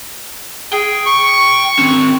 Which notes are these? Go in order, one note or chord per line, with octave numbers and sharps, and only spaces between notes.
G#4 G5
C#6
D#3 C4